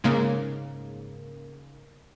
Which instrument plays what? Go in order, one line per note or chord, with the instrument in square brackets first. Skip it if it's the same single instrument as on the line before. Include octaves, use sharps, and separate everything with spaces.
[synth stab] G#2 C#3 A#3